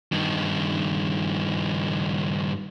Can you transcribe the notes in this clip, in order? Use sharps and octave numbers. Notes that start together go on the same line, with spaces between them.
G2 D#3